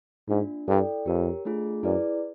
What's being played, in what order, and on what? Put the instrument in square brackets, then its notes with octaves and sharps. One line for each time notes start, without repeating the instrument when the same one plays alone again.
[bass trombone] G#2 [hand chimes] A#3 D4 F4
[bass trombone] G2 [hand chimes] E4 A4 D5 G5
[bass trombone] F2 [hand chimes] G4 A#4 C#5
[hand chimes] A3 D4 F4 G#4
[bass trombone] F#2 [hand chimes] E4 G#4 B4 D5